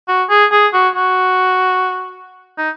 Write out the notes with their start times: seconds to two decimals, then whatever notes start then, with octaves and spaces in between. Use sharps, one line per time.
0.08 F#4
0.30 G#4
0.52 G#4
0.73 F#4
0.96 F#4
2.58 D#4